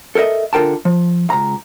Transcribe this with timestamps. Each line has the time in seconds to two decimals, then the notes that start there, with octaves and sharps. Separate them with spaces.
0.15 A4 A#4 C5 D#5 E5
0.53 D3 F4 A#4 G5 A5
0.85 F3
1.30 C#2 A#5